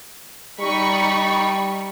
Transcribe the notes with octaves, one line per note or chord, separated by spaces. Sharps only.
G3 D#4 B5 C#6